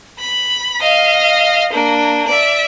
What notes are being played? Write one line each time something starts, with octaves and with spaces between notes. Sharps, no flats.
B5
D#5 F5
A#3 D4
D5 E5